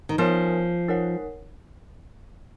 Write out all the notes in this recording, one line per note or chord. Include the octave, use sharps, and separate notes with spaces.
D#3
F3 B3 D#4 A#4 C#5 G#5
D#4 A#4 C#5 F#5